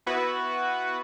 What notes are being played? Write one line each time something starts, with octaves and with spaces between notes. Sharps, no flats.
B3 E4 F#4 B4